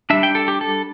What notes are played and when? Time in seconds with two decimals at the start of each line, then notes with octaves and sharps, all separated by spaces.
0.10 G3 D4 E5
0.23 G5
0.35 A4
0.48 G4
0.61 A4